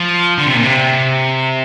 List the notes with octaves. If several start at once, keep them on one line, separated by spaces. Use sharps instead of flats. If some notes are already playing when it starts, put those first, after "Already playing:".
Already playing: F3
D3
C3
A#2
C3